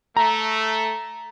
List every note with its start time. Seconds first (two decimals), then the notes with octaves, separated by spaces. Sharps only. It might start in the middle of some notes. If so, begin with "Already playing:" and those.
0.17 A3 A#5